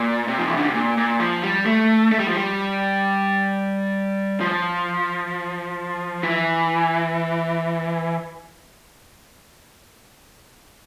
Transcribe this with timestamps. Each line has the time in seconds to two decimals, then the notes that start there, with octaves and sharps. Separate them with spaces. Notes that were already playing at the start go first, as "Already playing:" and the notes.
Already playing: A#2
0.28 C3
0.39 F3
0.48 E3
0.57 D3
0.65 C3
0.75 A#2
0.97 A#2
1.20 F3
1.43 G3
1.66 A3
2.12 A3
2.20 G3
2.27 F3
2.36 G3
4.40 F3
6.23 E3